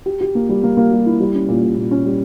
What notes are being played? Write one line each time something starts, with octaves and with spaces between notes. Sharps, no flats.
G4
G4
A#3
G3
A#3
A#3
G3
E4
G3
C#4
A#2
A#2
A#2
C#4
G3